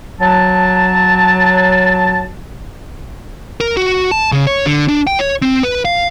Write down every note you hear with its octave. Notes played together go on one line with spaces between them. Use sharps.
F#3 A5
A#4
F#4
A5
C#3
C#5
D3
D4
G5
C#5
C4
B4
F5